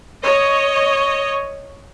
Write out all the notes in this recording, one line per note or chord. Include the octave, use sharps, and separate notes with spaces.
C#5 D#5